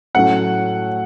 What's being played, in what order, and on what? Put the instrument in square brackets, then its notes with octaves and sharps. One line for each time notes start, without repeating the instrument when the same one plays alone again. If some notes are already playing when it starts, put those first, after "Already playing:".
[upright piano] A2 F#3 A3 C#4 F#5